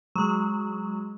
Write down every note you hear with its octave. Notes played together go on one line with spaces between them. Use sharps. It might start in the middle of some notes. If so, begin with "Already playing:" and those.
F#3 G#3